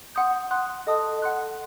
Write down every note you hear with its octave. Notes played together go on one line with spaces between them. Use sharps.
F#5 C6 D#6 G6
F#5 C6 D#6 F#6
A4 D#5 A5 D#6
F#5 C6 F#6